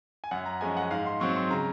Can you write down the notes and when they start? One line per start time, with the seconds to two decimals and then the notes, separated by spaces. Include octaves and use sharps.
0.24 G#5
0.31 F#2 F#5
0.46 A#5
0.61 F3 G#3 C#4 G#5
0.77 F#5
0.91 G#2 F5
1.06 C6
1.20 F#3 C4 C#6
1.36 C6
1.51 C#3 A#5